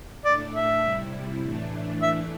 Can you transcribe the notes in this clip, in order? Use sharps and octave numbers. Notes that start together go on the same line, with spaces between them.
A2 A3 D4 D5
E5
C3 G3 E4
A2 E3 A3 D4
E3 A3 D4 E5